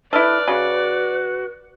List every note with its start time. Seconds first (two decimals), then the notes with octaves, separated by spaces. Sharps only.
0.13 E4 A4 B4 D5 F6
0.48 C#3 F#4